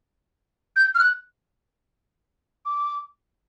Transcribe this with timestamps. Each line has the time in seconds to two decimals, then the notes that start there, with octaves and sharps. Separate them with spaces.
0.76 G6
0.95 F6
0.99 F#6
2.66 D6